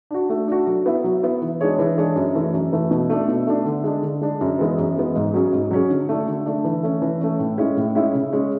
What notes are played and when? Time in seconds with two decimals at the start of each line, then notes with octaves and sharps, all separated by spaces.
0.11 D4 F#4
0.30 A3
0.48 D4 F#4
0.67 F#3
0.86 B3 E4
1.04 F#3
1.23 B3 E4
1.42 E3
1.61 G#3 D4 G#4 C#5
1.79 E3
1.98 G#3 D4 G#4 C#5
2.16 F#2
2.35 E3 A3
2.54 F#2
2.73 E3 A3
2.91 B2
3.10 A3 D4
3.28 B2
3.47 A3 D4
3.65 D3
3.84 G#3 D4
4.03 D3
4.21 G#3 D4
4.41 F#2
4.59 E3 G#3 B3
4.78 F#2
4.96 E3 G#3 B3
5.16 G#2
5.34 F#3 C#4 G#4
5.53 G#2
5.71 F#3 C#4 G#4
5.90 D3
6.09 A3 D4
6.27 D3
6.46 A3 D4
6.64 E3
6.83 A3 C#4
7.02 E3
7.21 A3 C#4
7.39 A2
7.58 G#3 C#4 E4
7.77 A2
7.95 G#3 C#4 E4
8.14 C#3
8.33 G#3 C#4